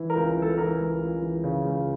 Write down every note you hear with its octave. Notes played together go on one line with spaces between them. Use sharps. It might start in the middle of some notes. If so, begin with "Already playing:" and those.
Already playing: E3
A#4
C#2
E3
A4
E3 A#4
C#2
C#2
E3
C#3
C#2